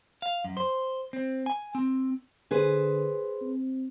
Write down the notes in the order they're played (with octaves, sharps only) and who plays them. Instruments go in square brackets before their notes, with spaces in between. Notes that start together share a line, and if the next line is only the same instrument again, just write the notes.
[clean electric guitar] F5
F#2
C5
C4
G#5
C4
[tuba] D3 [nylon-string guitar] G#4 B4 C5
[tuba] C4